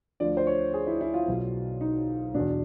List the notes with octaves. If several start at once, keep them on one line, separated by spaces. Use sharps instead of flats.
D2 D3 F3 D5
C5
C#5
G#4
E4
E4
F4
B1 B2
D#4
E2 B2 D4